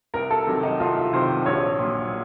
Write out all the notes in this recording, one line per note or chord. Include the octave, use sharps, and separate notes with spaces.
C2 A#4
A4
C3 D#3 F#3
D#4
C2 F4
C3 D#3 F#3 C5
A#1 C#5
A#2 F#3